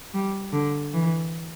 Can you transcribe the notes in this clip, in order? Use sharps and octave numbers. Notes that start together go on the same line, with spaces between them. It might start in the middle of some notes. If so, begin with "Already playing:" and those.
G3
D3
E3